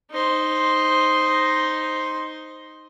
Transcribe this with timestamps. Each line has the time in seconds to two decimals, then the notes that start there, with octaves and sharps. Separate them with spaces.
0.12 D#4 C5